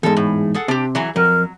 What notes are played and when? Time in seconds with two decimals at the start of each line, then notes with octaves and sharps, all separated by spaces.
0.03 E2 G#2 G#3 A4
0.17 A2
0.54 G#4 A4 F#5
0.68 C3 D4 G4
0.95 E3 F#3 G#4
1.16 F2 F#3 A#4